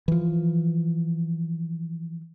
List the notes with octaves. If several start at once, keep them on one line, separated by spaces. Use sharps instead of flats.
E3 F3